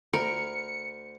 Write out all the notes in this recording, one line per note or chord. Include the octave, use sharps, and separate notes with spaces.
D2 A#4 B5 C#7